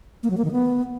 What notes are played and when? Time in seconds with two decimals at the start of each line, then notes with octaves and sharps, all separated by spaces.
0.23 A#3
0.30 F#3
0.37 A#3
0.45 D#3
0.52 B3